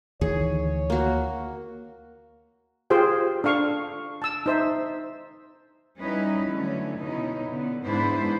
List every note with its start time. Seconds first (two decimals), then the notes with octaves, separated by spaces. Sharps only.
0.21 D2 D#3 E3 G#4 C#5
0.90 A#3 F#4
2.90 F4 G4 G#4 C5 G5
3.44 D4 A4 F5 C#6
4.22 A5 E6
4.46 D#4 C5 E5
5.99 G3 C#4 D#4 E4 B4 D#5
6.50 D3 F#3 A3 C#4
6.98 B2 B3 C#4 D#4 E4
7.50 D3 B3
7.83 G#2 B3 D4 E4 B4 C5